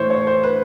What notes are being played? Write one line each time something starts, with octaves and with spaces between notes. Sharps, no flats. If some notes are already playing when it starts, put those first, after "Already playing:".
Already playing: A2 E3 C5 C#5
C#5
C5
B4